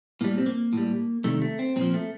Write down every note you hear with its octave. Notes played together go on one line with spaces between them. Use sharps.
A2 G3 A#3
C4
A#3
A2 G3
C3 D#3 G3 A3
A3
C4
A#2 F3 C4
A3